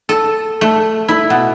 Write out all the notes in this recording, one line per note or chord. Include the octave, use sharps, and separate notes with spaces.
A4
A3
E4
B2